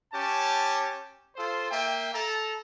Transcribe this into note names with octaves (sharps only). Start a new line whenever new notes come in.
C#4 G4 A5
F4 A4 C5
A#3 E5 G5
A4 A#5